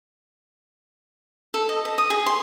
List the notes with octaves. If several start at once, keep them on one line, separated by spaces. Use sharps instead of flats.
A4
D#5
D#5
D#6
G#4
C6